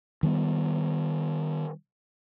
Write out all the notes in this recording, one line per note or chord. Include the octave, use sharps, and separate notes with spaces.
D#3 G3 B3